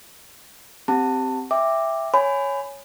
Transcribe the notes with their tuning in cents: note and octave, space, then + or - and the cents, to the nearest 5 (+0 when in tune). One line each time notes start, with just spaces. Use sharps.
C4 +0 G4 +0 A5 +20
E5 +0 G5 +20 D6 +5
C#5 +0 G#5 +0 B5 +25